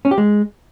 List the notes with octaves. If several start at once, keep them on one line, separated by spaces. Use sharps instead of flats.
C#4
G4
G#3